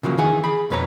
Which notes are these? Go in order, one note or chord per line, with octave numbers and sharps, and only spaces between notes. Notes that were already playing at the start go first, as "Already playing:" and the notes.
C#3 F3 F#3 A#3
D#3 E3 G#4 F#5
G#4 B5
B1 F2 B4 C#5 A#5